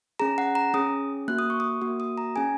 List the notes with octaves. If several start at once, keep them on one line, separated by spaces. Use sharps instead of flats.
C#4 G#4 A#5
F#5
A#5
C#4 G#4 D#6
A#3 F#4 F#6
D#6
C#6
D#6
A#3 F#4
D#6
A#5
C#4 G#4 G#5